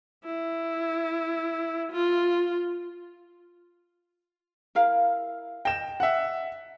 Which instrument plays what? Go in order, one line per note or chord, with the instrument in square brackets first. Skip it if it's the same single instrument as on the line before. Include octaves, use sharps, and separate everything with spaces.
[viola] E4
F4
[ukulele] E4 A#4 F5
[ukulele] D#5 [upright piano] G5 E7
[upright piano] E5 F#5